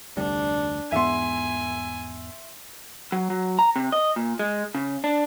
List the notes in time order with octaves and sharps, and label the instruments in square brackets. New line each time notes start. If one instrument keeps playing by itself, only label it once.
[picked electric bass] F1 D2 G3 [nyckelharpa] D4
[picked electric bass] E2 G#2 B3 [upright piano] E5 C6 [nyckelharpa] G#5
[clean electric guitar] F#3
F#3
A#5
C3
D#5
A#2
G#3
C#3
D4